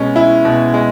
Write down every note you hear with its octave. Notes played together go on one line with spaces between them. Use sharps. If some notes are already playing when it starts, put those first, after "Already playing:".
Already playing: B2 G#3 C#4
E4
B2
G#3